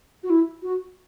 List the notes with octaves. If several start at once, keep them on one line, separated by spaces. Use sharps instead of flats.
F#4
E4
F#4